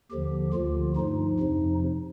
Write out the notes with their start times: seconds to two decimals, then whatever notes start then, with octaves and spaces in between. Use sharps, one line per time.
0.10 D#2 D3 F3 G4
0.53 D2 D3 F3 F4
0.96 G2 F3 D#4
1.39 F2 C3 F3